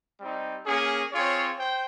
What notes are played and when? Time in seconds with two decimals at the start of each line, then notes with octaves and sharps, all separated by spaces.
0.19 G3 C4 D#4
0.65 A#3 C#4 G#4
1.11 C4 F4 G#4 C#5
1.58 C5 G5